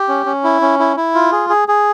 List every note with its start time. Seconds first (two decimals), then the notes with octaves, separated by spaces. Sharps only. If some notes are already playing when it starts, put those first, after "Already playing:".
Already playing: G4
0.09 C#4
0.26 C#4
0.44 E4
0.62 C#4
0.79 E4
0.97 E4
1.15 F4
1.32 G#4
1.49 G#4
1.68 G#4